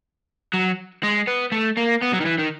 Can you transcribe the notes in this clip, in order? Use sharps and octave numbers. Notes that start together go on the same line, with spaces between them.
F#3
G#3
B3
A3
A#3
B3
F#3
D#3
E3
D#3